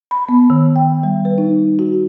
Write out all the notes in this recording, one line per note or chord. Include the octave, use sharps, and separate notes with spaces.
B5
B3
D#3
G5
G3
B4
D#4
F#4